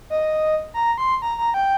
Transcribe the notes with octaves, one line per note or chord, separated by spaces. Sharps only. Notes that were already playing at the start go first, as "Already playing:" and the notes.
D#5
A#5
C6
A#5
A#5
G5